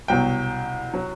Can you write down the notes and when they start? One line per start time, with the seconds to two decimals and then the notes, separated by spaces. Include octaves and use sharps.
0.08 C2 B2 F#3 G5
0.94 F#3